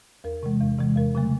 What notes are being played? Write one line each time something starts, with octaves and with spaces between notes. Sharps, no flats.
E2 A#4
C3 E3 G#3
E2
C3 E3 G#3
E2 A#4
C#3 F#3 A3